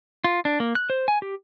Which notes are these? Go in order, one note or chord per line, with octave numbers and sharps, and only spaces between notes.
F4
D4
A#3
F#6
C5
G#5
G4